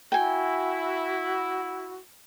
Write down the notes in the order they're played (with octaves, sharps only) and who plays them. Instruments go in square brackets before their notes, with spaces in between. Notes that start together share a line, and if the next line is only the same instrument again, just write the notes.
[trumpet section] E4 [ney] F#4 [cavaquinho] G5 G#5